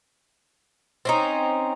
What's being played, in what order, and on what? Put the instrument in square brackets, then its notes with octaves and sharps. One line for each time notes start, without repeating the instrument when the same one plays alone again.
[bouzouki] C4 C#4 D#4